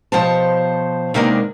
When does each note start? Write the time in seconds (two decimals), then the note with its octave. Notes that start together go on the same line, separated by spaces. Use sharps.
0.12 B2 F3 G4 C5 C#5 A5
1.14 C3 D#3 G#3 A#3 B3 D4